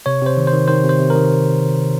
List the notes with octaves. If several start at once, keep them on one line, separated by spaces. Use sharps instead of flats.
C3 C#5
C3
C5
D#3
C5
D#3
D#3 C5
C3
C5
C3
A#4
D#3